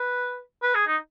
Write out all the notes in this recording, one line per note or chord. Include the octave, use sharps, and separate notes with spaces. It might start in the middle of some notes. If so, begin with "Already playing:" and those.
Already playing: B4
B4
G#4
D#4